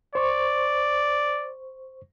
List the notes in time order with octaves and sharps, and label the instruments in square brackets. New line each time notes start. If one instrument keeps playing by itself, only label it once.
[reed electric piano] C5 C#6 [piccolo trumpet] D5